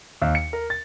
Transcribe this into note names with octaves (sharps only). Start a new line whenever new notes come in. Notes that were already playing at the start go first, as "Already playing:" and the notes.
D#2
C#7
A#4
A6